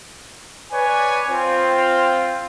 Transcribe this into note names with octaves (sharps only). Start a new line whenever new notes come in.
B4 C#5 D5 G#5
C4 F4